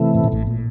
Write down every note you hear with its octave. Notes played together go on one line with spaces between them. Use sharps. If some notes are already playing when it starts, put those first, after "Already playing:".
Already playing: C3 E3 A3
A2
A#2
A1 A2
A#2